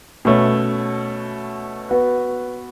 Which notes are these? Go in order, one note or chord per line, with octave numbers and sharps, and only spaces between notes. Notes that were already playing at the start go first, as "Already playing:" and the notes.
B2 A3 C#4
B3 F#4 B4